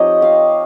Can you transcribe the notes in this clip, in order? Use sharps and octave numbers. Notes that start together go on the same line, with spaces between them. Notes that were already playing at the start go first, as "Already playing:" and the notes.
Already playing: F3 C4 D#4 G4 C#5 D#5
F5